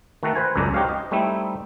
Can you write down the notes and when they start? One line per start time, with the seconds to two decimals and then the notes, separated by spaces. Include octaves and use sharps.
0.23 D#3 A3 F#4 A4 A#5
0.35 B4 C5 G#5
0.56 C#2 F#2 G#3 A4 D5 A#5
0.74 D#4 F#4 G4 C5 C#5 F5
0.89 D#5
1.11 G3 A3 C4 D#4 E4